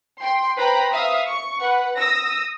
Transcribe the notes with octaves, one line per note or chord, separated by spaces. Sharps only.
G5 C6
B4 C5 G5 A#5 B5
E5 F5 D#6
C#6
B4 F#5
D#6 E6 A#6